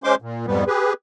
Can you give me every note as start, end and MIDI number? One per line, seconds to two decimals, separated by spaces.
0.04 0.15 56
0.04 0.15 61
0.04 0.15 72
0.04 0.15 84
0.04 0.15 86
0.22 0.46 46
0.47 0.64 41
0.47 0.64 44
0.47 0.64 55
0.47 0.64 59
0.67 0.93 67
0.67 0.93 68
0.67 0.93 71